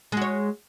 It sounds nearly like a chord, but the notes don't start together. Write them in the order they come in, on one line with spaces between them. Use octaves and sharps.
G#3 F#4 C#5